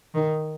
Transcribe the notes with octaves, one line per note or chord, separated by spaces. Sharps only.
D#3